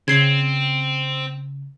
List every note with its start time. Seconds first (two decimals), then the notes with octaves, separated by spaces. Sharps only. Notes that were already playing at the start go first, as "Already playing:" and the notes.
0.08 C#3 C4 G#6 C7 F#7